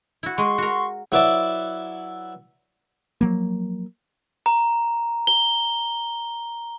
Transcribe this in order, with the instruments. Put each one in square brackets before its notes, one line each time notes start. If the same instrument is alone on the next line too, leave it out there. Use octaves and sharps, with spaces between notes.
[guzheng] E4 F#4
[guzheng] G#3 [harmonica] C6 C#6
[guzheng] F#4 A#4
[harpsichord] F#3 E4 F#4 B4 D5 E5
[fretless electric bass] F3 F#3 A#3
[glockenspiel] A#5
G7